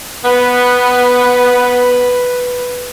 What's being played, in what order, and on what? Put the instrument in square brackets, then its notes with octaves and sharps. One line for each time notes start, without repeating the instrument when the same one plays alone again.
[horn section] B3 [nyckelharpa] B4